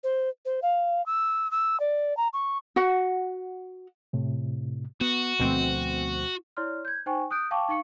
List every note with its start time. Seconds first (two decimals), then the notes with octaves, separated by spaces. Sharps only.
0.04 C5
0.45 C5
0.62 F5
1.06 E6
1.51 E6
1.80 D5
2.17 A#5
2.33 C#6
2.76 F#4 F#5
4.13 A2 C3
5.01 B3 F#4
5.39 D2 B2 F3 A3 C4
6.57 E4 C#5 D5 C6 F6
6.85 G6 G#6
7.06 D#4 C5 G5 G#5 C#6
7.31 D#6 F#6 G6 D7
7.51 F5 G5 A5 C#6 D6
7.69 D#4 F5 C#6 C#7